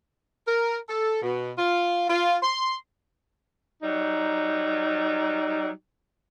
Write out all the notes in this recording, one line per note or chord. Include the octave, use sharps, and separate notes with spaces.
A#4
A4
B2
F4
F4
C6
F#3 G3 D#4